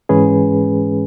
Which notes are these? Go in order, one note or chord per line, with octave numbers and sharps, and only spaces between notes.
G#2 E3 G#3 C#4 G#4 B4